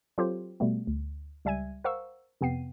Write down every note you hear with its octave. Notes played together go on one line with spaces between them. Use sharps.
F#3 C4 F4 G4 A4 C5
B2 G3 A3 B3
D2
C#2 G3 E5 G#5 G#6 D#7
A#4 C5 F5 F#5 C#6 E6
F2 C3 B3 G5 C7 D#7